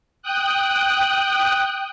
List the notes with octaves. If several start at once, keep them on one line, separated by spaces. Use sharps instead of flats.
G5 D#6 F#6